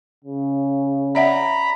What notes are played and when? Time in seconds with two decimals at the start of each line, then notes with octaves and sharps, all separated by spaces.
0.25 C#3
1.15 D5 E5 F#5 A#5 B5